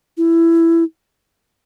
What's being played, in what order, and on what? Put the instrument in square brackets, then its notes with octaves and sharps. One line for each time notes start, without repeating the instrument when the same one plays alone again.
[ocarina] E4